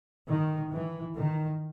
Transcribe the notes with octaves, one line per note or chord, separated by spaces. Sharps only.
D#3
E3
D#3